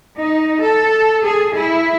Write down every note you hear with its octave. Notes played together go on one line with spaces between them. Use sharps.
D#4
A4
G#4
E4